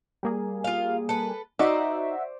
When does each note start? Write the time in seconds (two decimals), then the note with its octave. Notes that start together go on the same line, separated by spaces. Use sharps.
0.23 G3 A#3 G#4
0.64 F4 F5
1.09 A4 B4
1.59 D#4 F#4 C5 D5 E5